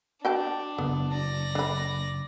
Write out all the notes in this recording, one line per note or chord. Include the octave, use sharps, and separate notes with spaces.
D4 F#4 G5 A5
F#1 B3
D5 A#6
D4 B5